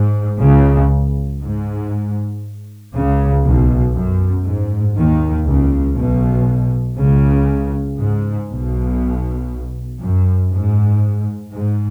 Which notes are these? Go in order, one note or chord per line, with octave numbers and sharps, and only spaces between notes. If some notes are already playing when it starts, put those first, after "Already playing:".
Already playing: G#2
C#2 C#3
G#2
C#2 C#3
B1 B2
F#2
G#2
D#2 D#3
C#2 C#3
B1 B2
C#2 C#3
G#2
B1 B2
F#2
G#2
G#2